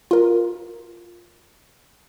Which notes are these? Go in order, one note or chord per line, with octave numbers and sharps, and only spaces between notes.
F4 A#4